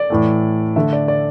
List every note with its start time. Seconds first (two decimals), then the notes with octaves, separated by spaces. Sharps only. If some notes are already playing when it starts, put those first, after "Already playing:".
Already playing: D5
0.10 A2 E3 A3
0.76 D3 A3 E5
0.93 D5
1.08 D5